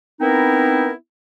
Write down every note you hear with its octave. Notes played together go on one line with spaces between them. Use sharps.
B3 C4 D#4 E4 A#4